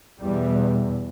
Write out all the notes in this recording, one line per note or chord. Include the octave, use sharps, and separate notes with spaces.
E2 B2 G3